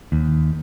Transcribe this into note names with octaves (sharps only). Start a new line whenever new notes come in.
D#2